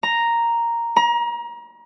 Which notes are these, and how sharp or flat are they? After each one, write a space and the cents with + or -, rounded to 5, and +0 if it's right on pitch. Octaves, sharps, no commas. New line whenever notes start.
A#5 +0
A#5 +30